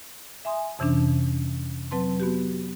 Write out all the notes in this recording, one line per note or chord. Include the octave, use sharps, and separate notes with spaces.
E5 G#5 C6 D#6
F2 C3 E3 C#4 D4
F#3 C4 B4 A5 C6
B3 F#4 G4